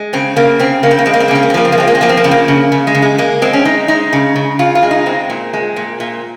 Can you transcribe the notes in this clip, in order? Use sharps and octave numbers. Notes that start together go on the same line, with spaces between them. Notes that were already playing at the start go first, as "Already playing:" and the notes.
Already playing: G#3
C#3 C4
C#3 A#3
C#3 C4
C#3 A#3
C4
A#3
G#3 C4
A#3
C4
A#3
C#3 C4
A#3
C4
F3 A#3
C4
A#3
G#3 C4
A#3
C4
F3 A#3
C4
A#3
C#3 C4
A#3
C#3
C#3
G#3
C#3
G#3
G#3 A#3
G#3 C4
C#4
G#3 D#4
G#3 D#4
C#3
C#3
C#3 F4
F4
G#3
D#4
G#3 C4
A#2
G#3
A#2
A#2